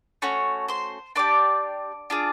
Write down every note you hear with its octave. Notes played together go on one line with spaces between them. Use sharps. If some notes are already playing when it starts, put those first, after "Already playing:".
A3 C#4 F#4 C#5 C#6
C5 C6
D4 G4 D5 D6
D4 F4 G#4